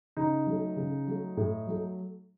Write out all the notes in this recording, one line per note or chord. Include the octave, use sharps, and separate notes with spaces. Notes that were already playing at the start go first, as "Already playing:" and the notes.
C#3 D#4
F#3 A3
C#3
F#3 A3
A2
F#3 A3